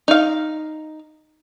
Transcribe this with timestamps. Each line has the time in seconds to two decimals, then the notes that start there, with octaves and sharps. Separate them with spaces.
0.08 D#4 F5